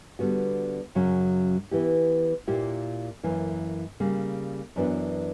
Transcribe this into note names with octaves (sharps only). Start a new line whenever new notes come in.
D3 G3 B3 F#4
F#2 C#3 F#3 C#4
E3 B3 E4 G4
A#2 A#3 E4 G4
F#2 E3 A#3
C#3 G3 A#3
F#2 E3 B3 D4 F#4